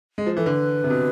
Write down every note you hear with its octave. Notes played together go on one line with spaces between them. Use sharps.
G#3
F3
E3 A4
D3 B4
C3
B2